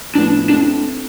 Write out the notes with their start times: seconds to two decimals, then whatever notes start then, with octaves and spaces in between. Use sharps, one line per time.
0.15 A2 F3 B3 D4 E4
0.49 A3 C4 D4 E4